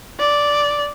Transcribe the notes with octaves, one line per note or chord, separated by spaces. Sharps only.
D5